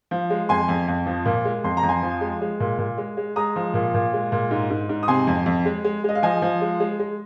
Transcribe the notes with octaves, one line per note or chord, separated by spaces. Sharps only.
F3
G#3
F2 G#5 C6
F2
F2
F3
A#2
G#3
F2 C6
A#5
F2
G#5 C6
F3
G#3
G#3
A#2
A#2
G#3
G#3
G#3 A#5 D#6
F3
A#2
A#2
G#3
A#2
G#2
G#2
G#2
D#6
C3 G#5 C6
F2
F2
G#3
G#3
G#3 D#5
F5
F3 D#5 G#5
F3
G#3
G#3
G#3